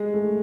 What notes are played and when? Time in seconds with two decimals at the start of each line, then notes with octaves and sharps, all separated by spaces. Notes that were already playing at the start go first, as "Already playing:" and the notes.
Already playing: G#3
0.14 A3